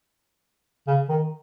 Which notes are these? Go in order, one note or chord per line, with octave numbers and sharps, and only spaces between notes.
C#3
D#3